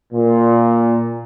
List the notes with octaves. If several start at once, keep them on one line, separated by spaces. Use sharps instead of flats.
A#2